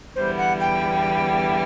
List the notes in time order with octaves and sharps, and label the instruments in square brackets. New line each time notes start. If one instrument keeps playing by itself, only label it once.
[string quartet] E2 D3 G3 B3 E4 [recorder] C5
[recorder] F#5
G5